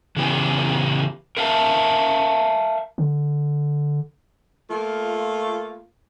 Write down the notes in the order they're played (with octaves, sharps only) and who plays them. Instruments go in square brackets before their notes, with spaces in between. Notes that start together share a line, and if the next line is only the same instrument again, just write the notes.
[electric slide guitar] C#3 E3 B3 G4 B4 G#5
A#4 E5 F5 A5
[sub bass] D3
[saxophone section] A3 A#3 F4